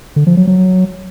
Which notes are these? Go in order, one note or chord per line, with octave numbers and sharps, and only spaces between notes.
D3
F3
F#3
F#3